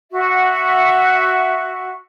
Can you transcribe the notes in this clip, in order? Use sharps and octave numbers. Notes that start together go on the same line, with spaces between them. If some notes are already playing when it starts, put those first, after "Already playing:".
F#4 E5